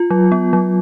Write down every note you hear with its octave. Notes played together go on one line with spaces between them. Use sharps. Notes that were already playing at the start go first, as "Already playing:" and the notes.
Already playing: F4
F#3
B3
F#3